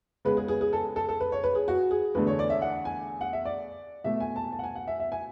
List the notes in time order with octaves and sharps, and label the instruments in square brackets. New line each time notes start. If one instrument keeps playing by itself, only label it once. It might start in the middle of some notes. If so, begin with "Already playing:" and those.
[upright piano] C#3 G#3 B3 B4
G#4
G#4
G#4
A4
A4
A4
B4
C#5
B4
G#4
F#4
G#4
E2 D3 A3 B4
C#5
D5
E5
F#5
G#5
F#5
E5
D5
B2 A3 E5
G#5
A5
A5
F#5
G#5
F#5
E5
E5
G#5